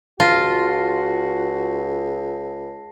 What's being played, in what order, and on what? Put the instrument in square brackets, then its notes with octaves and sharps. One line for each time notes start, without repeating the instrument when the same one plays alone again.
[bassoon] C#2 [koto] F4 [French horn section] F#4 [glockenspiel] A5 A#6 C7